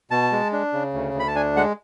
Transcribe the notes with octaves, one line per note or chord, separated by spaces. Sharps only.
B2 A5
G#3
D4
C#3
D2
D2
B5
A5
D4 G#5
G#3 F#5